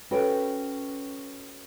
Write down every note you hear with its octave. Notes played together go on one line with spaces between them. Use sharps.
C#4 F#4 A4 B4 C#5 G5